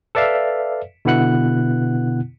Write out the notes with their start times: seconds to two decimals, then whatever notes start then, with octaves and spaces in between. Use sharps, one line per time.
0.15 A4 B4 D5 E5 F5
1.05 B2 D3 B3 E4 F#5 F#6